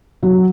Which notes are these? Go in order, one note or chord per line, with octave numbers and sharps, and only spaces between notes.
F#3